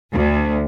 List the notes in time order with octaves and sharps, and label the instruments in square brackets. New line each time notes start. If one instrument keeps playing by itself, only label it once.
[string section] D2